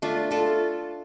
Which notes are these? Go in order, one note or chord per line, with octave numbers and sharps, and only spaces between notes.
A3 D4 F4
A3 F4 A4